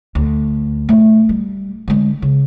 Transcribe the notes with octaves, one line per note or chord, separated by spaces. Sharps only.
D2
B2 A3
G3
D3 G#3
C#3